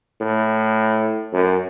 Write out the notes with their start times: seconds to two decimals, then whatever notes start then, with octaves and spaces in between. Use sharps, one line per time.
0.21 A2
1.33 F#2